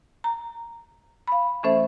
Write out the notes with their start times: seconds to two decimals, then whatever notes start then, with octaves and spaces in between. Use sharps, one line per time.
0.24 A#5
1.28 F5 B5
1.63 E3 A3 C#4 A4 C5 E5